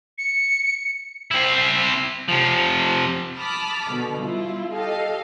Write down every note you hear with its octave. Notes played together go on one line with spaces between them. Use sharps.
C#7
C4 E4
C3 F3
A5 B5 D6 D#6 F6 B6
B2 D3
G3 E4 F4
G4 A4 D#5 F5